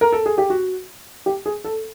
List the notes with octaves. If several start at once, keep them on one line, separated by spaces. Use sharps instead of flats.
A#4
A4
G#4
G4
F#4
G4
G#4
A4